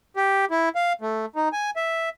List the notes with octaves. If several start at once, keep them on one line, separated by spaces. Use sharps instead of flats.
G4
E4
F5
A3
D#4
G#5
E5